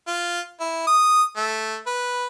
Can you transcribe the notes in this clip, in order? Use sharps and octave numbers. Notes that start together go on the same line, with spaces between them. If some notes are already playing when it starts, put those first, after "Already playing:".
F4
E4
D#6
A3
B4